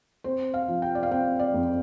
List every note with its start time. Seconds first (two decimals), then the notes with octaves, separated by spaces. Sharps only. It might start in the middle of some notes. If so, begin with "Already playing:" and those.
0.24 C4 C5
0.54 F5
0.68 F3
0.82 G5
0.95 D5
1.03 F5
1.11 C4 G5
1.39 D5
1.54 F2